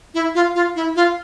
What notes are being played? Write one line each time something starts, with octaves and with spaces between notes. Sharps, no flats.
E4
F4
F4
E4
F4